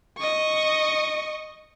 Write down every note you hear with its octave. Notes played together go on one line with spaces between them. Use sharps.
D#5 C#6